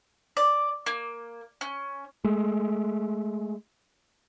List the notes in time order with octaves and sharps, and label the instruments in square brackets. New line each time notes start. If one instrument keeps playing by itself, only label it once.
[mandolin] D5
A#3
C#4
[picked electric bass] G#3 A3